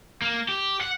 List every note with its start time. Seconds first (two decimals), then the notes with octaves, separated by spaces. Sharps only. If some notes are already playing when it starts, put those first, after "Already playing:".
0.22 A#3
0.49 G4
0.81 F#5